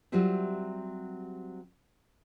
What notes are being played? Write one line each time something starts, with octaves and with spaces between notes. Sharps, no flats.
F#3 G3 C4 F4 G4 E5